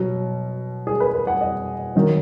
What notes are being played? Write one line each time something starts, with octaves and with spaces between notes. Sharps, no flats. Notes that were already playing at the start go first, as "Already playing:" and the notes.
Already playing: B2 F#3
G#4
B4
B4
F#5
D#5
D#3 F#3